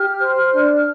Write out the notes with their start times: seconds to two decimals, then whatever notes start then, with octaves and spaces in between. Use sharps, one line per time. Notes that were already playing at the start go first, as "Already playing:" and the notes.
Already playing: G4 F6
0.19 C5
0.51 D4